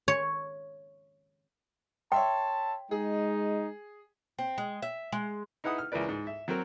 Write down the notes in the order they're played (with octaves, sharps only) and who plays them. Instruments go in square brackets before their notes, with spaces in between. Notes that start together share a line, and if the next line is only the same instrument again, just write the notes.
[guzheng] C#5
[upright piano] C#5 E5 C6 [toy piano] G5 [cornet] A5
[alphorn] G#3 [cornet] D#4 [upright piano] G#4
[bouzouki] C4
G#3
E5
G#3
[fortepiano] D#4 E4 B4 F#5 D#6
F6
C#2 E3 A#4 B4 D5
G#2
E5
F#3 C4 F#4 A#4